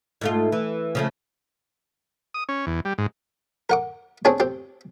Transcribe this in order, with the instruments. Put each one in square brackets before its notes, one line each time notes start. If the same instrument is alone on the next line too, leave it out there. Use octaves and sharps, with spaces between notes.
[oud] G#2 A3 F4
E3
C#3 F3 A3
[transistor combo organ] D#6
C#4
E2
G3
G#2
[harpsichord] A#4 F#5 D6
C4 D4 G#4 C#5
C4 G4